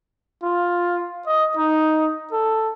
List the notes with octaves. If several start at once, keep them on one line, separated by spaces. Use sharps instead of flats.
F4
D#5
D#4
A4